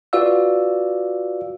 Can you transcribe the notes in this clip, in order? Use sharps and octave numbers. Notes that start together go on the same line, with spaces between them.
F4 F#4 B4 D5 F5 E6